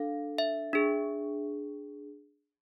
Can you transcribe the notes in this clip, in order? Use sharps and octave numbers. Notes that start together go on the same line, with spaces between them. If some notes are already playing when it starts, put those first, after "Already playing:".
Already playing: D4 A4 F5
E5
D4 G#4